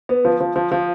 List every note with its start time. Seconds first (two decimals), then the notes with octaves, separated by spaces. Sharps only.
0.09 B3
0.25 F3
0.41 F3
0.56 F3
0.72 F3